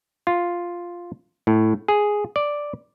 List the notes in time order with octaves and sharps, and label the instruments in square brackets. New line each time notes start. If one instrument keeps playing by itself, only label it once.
[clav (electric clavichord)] F4
A2
G#4
D5